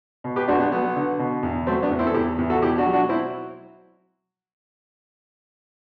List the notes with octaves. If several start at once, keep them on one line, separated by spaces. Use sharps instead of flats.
B2
G4 B4
B1 D4 F#4
B3 D4
F#3 B3
D3
B2
E2
F#3 A3 C4
B3 D4
E2
C4 E4
A4
E2 E4 G4
E2
F#4 A4
B2 E4 G4
D4 F#4
F#3
D4 F#4
C4 E4